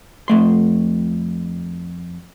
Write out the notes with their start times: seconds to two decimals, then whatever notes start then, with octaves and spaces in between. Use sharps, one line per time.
0.28 F2 A3 C6